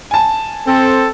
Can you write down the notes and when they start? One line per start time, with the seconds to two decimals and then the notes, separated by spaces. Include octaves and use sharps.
0.11 G#5 A5
0.68 C4 A4